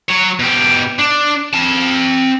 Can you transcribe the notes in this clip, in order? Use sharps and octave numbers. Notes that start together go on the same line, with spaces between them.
F#3 C#5
B2 G4
D4
C4 A5